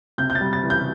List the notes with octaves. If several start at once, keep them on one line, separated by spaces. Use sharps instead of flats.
C3 G6
G6
A6
G3
A6
E3
G6